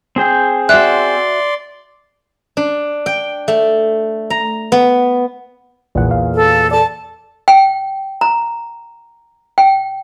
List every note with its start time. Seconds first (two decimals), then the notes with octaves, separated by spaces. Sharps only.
0.16 C4 G#4 G5
0.69 F#4 D5 E5 C6 F#6
2.57 D4
3.06 G5
3.48 A3
4.30 A#5
4.72 B3
5.95 A#1 E2 A#2 F#5
6.11 F5
6.35 A4
6.71 A4 D5 A5
7.48 G5
8.21 A#5
9.58 G5